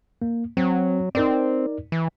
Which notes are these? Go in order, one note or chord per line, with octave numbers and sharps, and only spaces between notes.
A#3
F#3 C4
C4 D#4 A#4 D5
E3